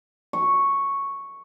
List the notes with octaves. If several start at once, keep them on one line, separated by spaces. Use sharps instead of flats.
C#6